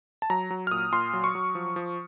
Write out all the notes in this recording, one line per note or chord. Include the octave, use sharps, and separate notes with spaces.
A5
F#3 A#5
F#3
F6
A#2 D#6
A#2 C6
F#3
C#6
F#3
F3
F3